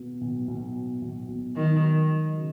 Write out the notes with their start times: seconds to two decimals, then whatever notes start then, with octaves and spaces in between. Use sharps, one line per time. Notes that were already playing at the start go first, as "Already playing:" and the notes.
Already playing: B2
0.21 B1
0.48 B1
0.75 B2
1.02 B1
1.28 B1
1.56 D#3 F#3
1.83 F#3
2.10 F#3
2.37 C#3